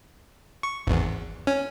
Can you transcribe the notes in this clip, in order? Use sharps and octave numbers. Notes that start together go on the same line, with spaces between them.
C#6
G#1 E2
C#4